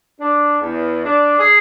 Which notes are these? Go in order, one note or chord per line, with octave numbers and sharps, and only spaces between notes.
D4
E2
D4
G#4